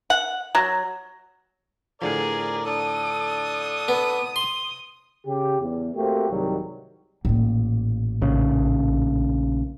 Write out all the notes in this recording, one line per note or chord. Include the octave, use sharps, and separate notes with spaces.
F#5
F#3
A2 D3 F3 G#4 A#4 D5
D4 A4 D#6
B3
C6
C#3 G4
E2
A3 A#3 C4 F#4 G4
C2 G#2 D#3 F#3 G3
A1 A#2
A#1 C#3